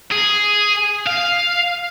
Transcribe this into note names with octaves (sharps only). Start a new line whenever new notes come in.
G#4
F5